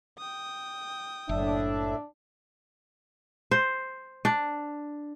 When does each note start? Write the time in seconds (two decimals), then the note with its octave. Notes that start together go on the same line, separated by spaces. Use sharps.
0.18 G5 D#6
1.29 F#1 A2 D4 E5
3.51 C5
4.25 D4